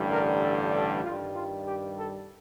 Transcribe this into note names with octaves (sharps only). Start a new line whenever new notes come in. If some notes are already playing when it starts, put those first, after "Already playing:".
Already playing: A1 G2 D3 G3
A#4
A4
A4
G2 D#3 G3 F4
F4
G4
A4